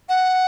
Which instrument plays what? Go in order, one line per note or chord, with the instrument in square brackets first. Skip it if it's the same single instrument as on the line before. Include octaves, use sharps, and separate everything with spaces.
[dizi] F#5